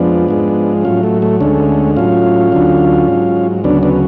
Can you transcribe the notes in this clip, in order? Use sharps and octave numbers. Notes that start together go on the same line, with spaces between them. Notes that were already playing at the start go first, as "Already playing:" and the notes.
Already playing: F2 F3 G#3 B3 D4
G#2 F3 G#3
A2 F#3 C#4 F4
A3
A3
D2 D3 G#3 A3 C#4
A2 F#3 C#4 F4
D2 D3 F#3
G#2 F#3
D2 C#3 F#3 B3 D4
B3 D4